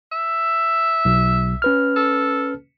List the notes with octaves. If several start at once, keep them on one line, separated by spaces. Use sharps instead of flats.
E5
B1
C#4 B4 F6
A4